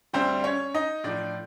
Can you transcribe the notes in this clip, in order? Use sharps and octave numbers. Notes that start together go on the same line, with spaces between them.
D2 D3 G3 C4 C5
C#4 C#5
D#4 D#5
A2 F3 D4 D5